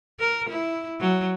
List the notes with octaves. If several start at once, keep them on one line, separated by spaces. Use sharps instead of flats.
A#4
E4
F#3